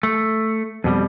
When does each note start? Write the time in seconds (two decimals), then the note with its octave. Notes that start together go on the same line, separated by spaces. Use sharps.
0.03 A3
0.84 F2 B2 G3